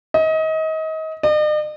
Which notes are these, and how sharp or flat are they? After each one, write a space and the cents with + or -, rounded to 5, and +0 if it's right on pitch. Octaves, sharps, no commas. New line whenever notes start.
D#5 +30
D#5 -45